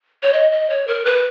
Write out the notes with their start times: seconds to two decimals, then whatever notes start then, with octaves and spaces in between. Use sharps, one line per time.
0.23 C#5
0.33 D#5
0.52 D#5
0.70 C#5
0.88 A#4
1.05 B4